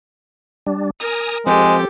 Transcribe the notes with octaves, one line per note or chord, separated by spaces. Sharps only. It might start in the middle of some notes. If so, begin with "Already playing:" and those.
G3 D4
A#4 G#5 A#5 D#6
F3 G#3 C4 G4 A4